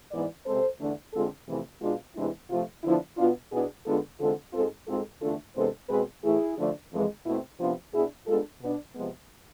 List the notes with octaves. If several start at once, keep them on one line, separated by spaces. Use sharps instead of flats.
G#2 E3 B3 B4 D5
C3 G#3 C4 A4 C5
E2 D3 A3 D4
D3 G#3 C4 F4 A4
F2 C3 E3 A3 E4 G#4
B2 G#3 D4 F4
E2 C3 E3 G#3 D4 E4
C3 F3 A3 F4
D3 F3 B3 D4 E4
B2 B3 D4 F4
B2 B3 D4 E4 G#4
D3 G#3 B3 D4 F4 A4
E2 D3 G#3 C4 F4 A4
G#2 G#3 C4 F4 A4
G#2 G#3 C4 F4 A4
E2 D3 A3 D4 F4 A4
E2 C3 G#3 B3 D4 A4 C5
B2 G#3 C4 G#4 B4
A2 E3 A3 E4 G#4
D3 F3 A3 D4
F2 E3 G#3
B2 A3 C4 E4
C3 F3 B3 D4 F4
B2 B3 D4 E4 G#4
G#2 G#3 B3 D4 F4 A4
B2 B3 D4
C3 F3 G#3 B3